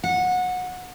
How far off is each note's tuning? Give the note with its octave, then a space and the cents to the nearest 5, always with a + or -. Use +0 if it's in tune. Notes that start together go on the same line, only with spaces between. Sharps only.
F#5 -20